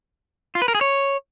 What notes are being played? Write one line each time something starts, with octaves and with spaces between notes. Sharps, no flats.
F4
B4
A#4
G#4
C#5